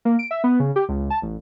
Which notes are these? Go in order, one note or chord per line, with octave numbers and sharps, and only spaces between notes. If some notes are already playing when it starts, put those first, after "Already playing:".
A#3
D7
E5
B3
C#3
G4
C#2
A5
A1